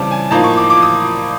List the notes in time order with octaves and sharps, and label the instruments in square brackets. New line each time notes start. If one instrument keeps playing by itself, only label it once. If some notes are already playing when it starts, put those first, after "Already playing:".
Already playing: [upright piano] C#3 E3 G3 C4 A5 D6
G#5
A2 F3 A#3 D#4 A5
C#6
D6
D6
D#6